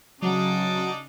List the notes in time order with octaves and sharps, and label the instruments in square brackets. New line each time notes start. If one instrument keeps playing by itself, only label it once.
[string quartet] C#3 [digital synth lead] F#3 [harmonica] D4 D#4 D5